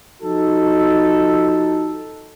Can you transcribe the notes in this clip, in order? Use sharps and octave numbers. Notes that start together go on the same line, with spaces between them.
F3 D#4 F#4 A4